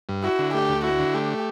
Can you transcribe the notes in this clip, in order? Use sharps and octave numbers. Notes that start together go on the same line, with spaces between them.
G2
E4 F#4
D3
A3 G4
D2
E4 F#4
D3
A3 G4